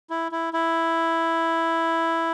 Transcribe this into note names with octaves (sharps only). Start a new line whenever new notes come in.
E4
E4
E4